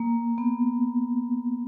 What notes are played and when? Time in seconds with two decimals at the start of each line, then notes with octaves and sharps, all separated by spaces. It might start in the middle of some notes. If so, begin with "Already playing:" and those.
Already playing: A#3
0.38 B3